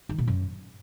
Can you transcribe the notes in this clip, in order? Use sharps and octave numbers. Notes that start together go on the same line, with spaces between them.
D#3
A#2
F#2